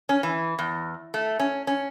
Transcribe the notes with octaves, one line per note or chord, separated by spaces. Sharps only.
C#4
E3
E2
A3
C#4
C#4